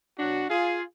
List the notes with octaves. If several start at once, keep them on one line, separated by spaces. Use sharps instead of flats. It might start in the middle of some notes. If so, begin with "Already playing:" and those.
B2 F#3 D4 F#4
F4 G#4